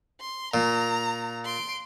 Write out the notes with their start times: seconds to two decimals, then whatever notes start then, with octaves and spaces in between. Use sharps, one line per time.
0.21 C6
0.54 A#2 A#5
1.44 C6 D7